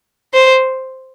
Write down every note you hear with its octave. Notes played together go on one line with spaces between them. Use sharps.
C5